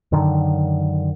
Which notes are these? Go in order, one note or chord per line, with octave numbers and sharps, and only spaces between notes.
F#2 D3 D#3